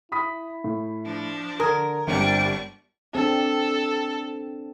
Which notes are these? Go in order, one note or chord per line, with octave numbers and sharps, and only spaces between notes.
E4 B5 D#6 B6
A2
F3 D4
D3 A#4 D#6 G#6
G1 G3 C4 D4 C#6
C4 D4 A4